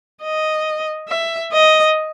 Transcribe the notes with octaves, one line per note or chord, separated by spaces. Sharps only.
D#5
E5
D#5